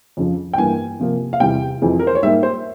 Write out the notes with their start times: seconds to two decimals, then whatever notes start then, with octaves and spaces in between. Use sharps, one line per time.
0.17 F2 C#3 F3
0.54 G5
0.58 G2 E3 A#3 G#5
1.00 C3 F3 A#3
1.33 F5
1.40 E2 C3 G3 C4 G5
1.82 F2 E3 G#3 C4
1.99 A#4
2.07 C5
2.15 C#5
2.23 G#2 G3 A#3 E5
2.43 C5